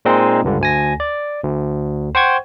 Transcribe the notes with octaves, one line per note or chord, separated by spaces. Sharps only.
A#2 G#3 C4 D#4
C#2 G2 D3
D2 G#5 A#6
D5
D2
C5 F#5 G5 C#6 G#6